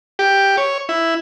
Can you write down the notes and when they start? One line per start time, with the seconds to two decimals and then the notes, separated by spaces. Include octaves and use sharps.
0.19 G4
0.57 C#5
0.89 E4